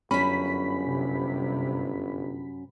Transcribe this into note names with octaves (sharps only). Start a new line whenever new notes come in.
G1 F#2 C#4 B5 B6
G2 C3